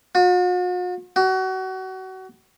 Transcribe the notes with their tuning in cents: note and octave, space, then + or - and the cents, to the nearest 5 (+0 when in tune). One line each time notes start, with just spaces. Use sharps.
F#4 -45
F#4 +30